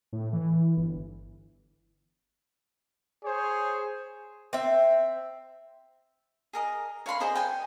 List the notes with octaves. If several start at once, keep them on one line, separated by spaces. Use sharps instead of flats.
A2
E3
G1
G#4 C5 C#5
C4 E5
G#4 A#4 D#5
C#5 F5 B5 C6
G#4 C5 D#5 A#5
G5 G#5